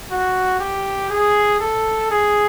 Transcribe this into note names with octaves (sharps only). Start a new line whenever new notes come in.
F#4
G4
G#4
A4
G#4